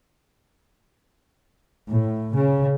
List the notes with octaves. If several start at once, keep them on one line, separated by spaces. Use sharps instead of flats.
A2
C#3